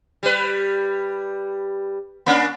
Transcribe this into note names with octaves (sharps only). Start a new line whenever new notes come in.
G3 B4
A#3 C#4 D4